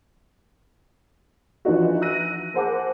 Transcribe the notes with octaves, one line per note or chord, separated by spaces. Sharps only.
E3 F3 D4 D#4 F#4
E6 F#6 A#6 D#7
G#4 A#4 C5 F#5 A5 D6